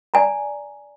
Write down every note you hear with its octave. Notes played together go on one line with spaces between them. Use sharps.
D5 G#5 A#5